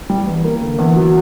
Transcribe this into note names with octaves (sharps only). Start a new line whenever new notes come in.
G3
E2
A#3
D3
E2
F#3